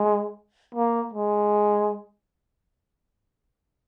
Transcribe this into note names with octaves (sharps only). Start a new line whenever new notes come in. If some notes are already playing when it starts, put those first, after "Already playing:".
Already playing: G#3
A#3
G#3